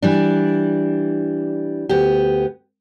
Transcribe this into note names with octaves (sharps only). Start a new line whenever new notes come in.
E3 G3 D4
D2 B3 G4